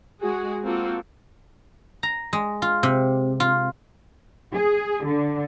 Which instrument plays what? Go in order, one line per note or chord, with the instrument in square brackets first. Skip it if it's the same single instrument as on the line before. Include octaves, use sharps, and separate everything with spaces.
[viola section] G#3 F#4 G#4
A#3 C4 F4 F#4 A4
[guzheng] A#5
G#3
F4
C3
F4
[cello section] G#4
D3